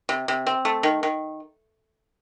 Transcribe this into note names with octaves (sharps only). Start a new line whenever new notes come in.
C3
C3
C4
A3
D#3
D#3